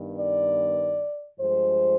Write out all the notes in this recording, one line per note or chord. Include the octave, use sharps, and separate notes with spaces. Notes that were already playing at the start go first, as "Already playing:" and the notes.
Already playing: G2 D#3 B3
D5
G2 F3 G#3 C5